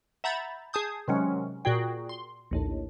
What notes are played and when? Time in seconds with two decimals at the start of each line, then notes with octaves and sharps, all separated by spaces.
0.24 E5 F#5 A#5 B5 G6 A6
0.73 G#4 G#5 A5 D#6 G6
1.08 C3 D#3 F#3 G#3 C#4
1.65 A#2 F#4 G#4 G5
2.09 C6
2.51 A#1 D#2 A2